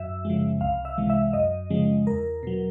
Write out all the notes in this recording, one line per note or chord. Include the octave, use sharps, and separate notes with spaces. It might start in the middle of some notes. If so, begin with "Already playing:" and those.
Already playing: F#2 E5
C#3 F3 G#3
C2 F5
E5
C3 E3 G#3
E5
F#2 D#5
C#3 F3 G#3
E2 A#4
B2 F#3